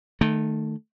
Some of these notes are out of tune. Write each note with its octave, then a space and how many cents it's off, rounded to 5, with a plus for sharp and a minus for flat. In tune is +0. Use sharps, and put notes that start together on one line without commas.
D#3 -20 A3 +0